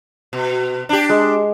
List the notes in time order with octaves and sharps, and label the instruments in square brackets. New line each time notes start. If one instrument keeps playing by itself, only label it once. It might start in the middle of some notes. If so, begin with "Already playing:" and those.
[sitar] B2
D4 G4
[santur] G#3